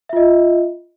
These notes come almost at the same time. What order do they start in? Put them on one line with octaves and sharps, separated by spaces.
E5 F4 D#5